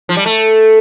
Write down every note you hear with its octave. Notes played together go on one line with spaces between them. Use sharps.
F3
G3
A3